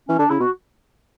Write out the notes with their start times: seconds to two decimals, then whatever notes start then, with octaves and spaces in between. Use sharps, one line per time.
0.08 E3 C#4
0.19 D3 D4
0.30 C#3 E4
0.40 B2 F#4